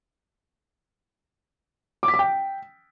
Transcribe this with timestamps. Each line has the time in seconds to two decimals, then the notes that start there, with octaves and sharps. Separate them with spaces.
2.03 D6
2.08 B6
2.14 D6
2.19 G5